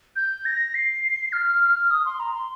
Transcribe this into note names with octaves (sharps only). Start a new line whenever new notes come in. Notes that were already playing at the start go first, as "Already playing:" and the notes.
G6
A#6
C7
F6
D#6
C6
A#5
C6